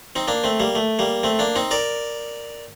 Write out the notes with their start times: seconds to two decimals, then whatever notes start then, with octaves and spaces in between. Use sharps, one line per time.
0.16 C4 D#4
0.28 A#3 D4
0.44 A3 C4
0.60 G3 A#3
0.75 A3
0.99 G3 A#3
1.23 A3 C4
1.39 A#3 D4
1.55 C4 D#4
1.71 A#4 D5